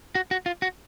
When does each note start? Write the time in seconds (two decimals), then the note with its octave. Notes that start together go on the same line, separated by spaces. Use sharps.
0.15 F#4
0.31 F#4
0.46 F4
0.62 F#4